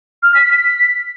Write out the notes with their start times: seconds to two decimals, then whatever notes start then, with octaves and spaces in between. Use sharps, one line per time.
0.23 F6
0.34 B6
0.46 B6